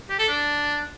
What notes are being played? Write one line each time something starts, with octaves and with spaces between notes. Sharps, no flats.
G4
A4
D4